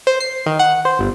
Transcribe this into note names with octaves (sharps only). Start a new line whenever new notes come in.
C5
C7
D#3
F#5
C5
G1